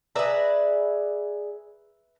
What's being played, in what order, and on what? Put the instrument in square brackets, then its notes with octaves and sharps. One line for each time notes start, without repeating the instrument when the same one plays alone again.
[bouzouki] G#4 D5 [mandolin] B4 E5 A#5